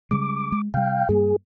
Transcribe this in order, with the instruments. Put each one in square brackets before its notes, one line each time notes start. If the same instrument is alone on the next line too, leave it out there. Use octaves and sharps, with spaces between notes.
[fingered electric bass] C#3 G3 G#3 [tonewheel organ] D6
[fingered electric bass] G#3
[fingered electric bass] C3 G3 [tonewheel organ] F5 G5
[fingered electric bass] G2 G3 A#3 [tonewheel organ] G#4